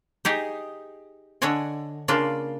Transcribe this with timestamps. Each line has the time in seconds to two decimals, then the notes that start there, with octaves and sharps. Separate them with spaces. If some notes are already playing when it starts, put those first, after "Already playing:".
0.25 D#4 G4 G#4
1.42 D3 D4 C#5 D#5 G#5
2.08 C#3 A#3 D4 F4